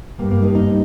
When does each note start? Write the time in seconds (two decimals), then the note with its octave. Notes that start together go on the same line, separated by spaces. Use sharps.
0.18 G2 G3 A#3
0.31 A#3
0.42 D#4
0.55 D#4